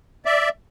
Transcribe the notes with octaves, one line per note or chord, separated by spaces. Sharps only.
D5 E5